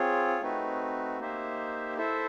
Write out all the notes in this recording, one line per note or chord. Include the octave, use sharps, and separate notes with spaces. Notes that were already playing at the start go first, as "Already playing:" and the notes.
Already playing: C4 F4 G#4 C#5
A3 C4 D#4 F#4 B4
A#3 D#4 G4 C5 E5
E4 A4 C5 E5